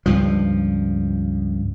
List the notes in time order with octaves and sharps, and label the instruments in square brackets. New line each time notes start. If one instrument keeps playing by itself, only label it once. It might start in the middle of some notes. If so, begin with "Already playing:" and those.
[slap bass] C#2 G2 F3